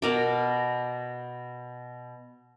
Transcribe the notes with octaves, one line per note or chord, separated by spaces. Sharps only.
B2 A#4 D6